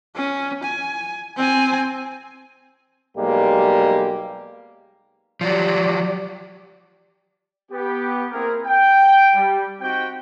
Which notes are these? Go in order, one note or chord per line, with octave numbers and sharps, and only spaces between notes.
C#4
G#5
C4 G#5
B1 G3 G#3 A#3 G4
F3 F#3 G4 D5
B3 G4
A#3 C4 E4 G#4 A#4
G5
G3
C4 D#4 F#4 G4 G5